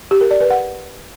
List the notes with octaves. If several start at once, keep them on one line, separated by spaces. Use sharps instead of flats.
G4
A#4
D5
B4
F#5